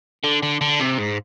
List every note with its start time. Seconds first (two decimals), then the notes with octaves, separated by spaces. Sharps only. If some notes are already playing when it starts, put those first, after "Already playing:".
0.24 D3
0.43 D3
0.61 D3
0.80 C3
0.98 G#2